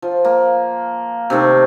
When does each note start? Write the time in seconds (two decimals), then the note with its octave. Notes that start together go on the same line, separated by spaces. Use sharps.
0.02 F3
0.25 A#3
1.30 C3 D#3 A3